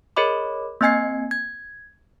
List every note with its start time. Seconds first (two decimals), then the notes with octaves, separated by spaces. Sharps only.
0.16 G#4 A#4 C#5 D#5 B5 D6
0.81 A#3 C4 D#5 G#5 G#6 C7
1.31 G#6